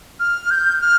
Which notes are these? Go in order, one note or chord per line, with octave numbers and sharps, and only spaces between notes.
F6
G6
F6